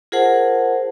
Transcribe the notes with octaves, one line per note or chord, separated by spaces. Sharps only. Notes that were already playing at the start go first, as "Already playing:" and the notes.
F4 G#4 A#4 C5 F#5 A5